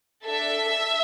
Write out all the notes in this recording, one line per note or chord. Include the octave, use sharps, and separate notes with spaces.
D4 A4 E5